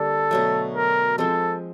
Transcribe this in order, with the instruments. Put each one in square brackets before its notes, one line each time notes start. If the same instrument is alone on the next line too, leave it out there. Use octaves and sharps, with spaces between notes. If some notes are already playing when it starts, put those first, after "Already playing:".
Already playing: [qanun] D3 G3 A#3 D4 [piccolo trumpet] A4
[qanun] B2 F#3 A3
[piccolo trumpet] A#4
[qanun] F3 G#3 C4 [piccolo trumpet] A4